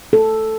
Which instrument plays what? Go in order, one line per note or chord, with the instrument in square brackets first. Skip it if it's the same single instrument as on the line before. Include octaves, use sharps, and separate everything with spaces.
[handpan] A4